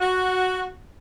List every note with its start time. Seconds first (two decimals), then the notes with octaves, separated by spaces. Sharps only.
0.01 F#4